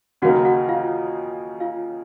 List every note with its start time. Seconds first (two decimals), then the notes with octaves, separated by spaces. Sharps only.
0.22 D#2 C#3 F#3 A#3 D#4 F#4 F#5
0.45 F#4 F#5
0.69 F4 F5
1.60 F4 F5